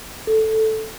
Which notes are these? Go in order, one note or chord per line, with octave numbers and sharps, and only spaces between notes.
A4